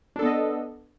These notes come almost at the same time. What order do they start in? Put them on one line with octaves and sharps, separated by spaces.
D4 A4 B3 D#5